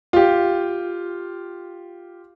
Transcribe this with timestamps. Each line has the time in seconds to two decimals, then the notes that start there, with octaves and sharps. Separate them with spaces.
0.13 F4 G4